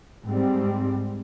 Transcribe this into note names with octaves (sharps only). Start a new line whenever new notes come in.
G#2 G3 C4